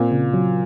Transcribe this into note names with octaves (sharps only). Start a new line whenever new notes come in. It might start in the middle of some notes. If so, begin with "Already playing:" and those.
Already playing: A#2 C4
C#3
F#3